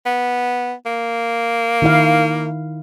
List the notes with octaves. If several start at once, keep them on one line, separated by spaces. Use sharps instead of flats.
B3
A#3
D#3 E4 F5